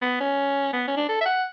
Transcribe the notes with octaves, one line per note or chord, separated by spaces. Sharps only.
B3
C#4
B3
C#4
D4
A4
E5
F#5